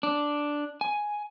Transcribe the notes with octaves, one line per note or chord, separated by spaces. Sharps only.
D4
G#5